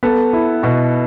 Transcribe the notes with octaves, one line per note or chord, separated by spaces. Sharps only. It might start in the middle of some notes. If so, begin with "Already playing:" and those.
B3 A4
E4
B2 F#4